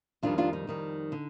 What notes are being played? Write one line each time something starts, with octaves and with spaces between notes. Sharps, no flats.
F2 D#3 G3 D4 F4
D4 F4
D#4
F2 D#3 G3
D3